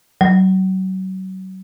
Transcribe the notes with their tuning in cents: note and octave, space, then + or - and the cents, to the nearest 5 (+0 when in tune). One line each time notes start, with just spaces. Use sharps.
F#3 +30